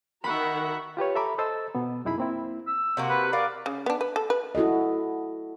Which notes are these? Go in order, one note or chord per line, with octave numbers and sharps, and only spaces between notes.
D#3 F#4 A#4 E5 F#5 B5
F4 G4 B4 C#5
A4 E5 A#5 B5 D6
A4 C5 D#5 E6 A6
B2 B3
C2 F#2 D#4 E4 G#4 B5
A#3 C4 E4
E6
C3 A#3 F#4
B4
A#4 D5 F5 F#5
C#3
B3 D4
B4
A4
B4
E4 F#4 A4 D#5